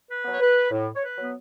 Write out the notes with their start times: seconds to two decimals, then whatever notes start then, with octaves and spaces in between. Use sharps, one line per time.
0.09 B4
0.25 F#3 B3 C#5
0.40 B4
0.71 A2
0.95 C#5
1.02 B4
1.18 F#3 B3